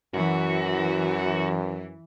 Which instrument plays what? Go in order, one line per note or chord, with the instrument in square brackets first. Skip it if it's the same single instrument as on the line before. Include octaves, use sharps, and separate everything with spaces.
[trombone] F#2 [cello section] E3 [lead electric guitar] F#4